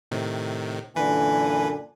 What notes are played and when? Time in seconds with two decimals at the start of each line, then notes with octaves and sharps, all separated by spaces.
0.11 A2 C3 D#3
0.96 F#2 A#2 D3 E3 B4 G#5